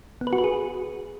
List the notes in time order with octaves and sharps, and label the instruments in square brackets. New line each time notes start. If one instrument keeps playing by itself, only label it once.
[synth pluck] B3
B4
F#4
B4
G#4